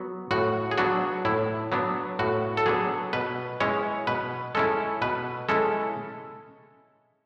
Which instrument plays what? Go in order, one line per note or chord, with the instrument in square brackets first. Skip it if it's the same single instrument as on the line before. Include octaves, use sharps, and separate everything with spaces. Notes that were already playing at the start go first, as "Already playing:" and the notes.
Already playing: [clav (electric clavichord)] F#3 B3 F#4
A2 F#4
G#4
F#3 B3 D4 F#4
A2 E4
F#3 B3 D4
A2 F#4
A4
F#3 B3 D4 G#4
B2 B4
G#3 C#4 E4 C#5
B2 B4
G#3 C#4 E4 A4
B2 B4
G#3 C#4 E4 A4